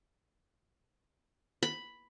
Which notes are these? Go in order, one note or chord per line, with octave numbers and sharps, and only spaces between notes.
B5